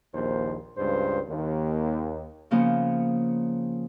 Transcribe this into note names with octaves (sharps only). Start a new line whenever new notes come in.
A#1 D#2 C5
C#2 G2 C5
D#2
C#3 F3 A#3 B3 C#4